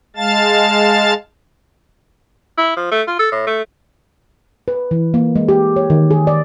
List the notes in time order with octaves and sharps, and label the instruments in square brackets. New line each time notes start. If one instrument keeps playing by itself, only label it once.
[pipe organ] G#3 F5 A5 A6
[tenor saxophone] E4
F3
A3
F4
A4
A2
A3
[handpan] B4
E3
A#3
G#3
G4
C#5
D#3
G#4
D5